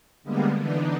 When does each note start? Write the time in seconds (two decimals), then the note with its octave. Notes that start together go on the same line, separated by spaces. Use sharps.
0.23 D3 G3 G#3 A#3 B3
0.57 D3 E3 B3 D4 D#4